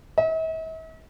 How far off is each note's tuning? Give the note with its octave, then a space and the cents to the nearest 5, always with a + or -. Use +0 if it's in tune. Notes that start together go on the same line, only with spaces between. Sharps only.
E5 -45